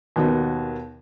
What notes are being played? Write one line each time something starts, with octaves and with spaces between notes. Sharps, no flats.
D#2 B2 D#3 B3